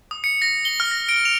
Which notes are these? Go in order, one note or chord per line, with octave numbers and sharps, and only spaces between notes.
D#6
C#7
A#6
G7
F6
A#6
D7
F7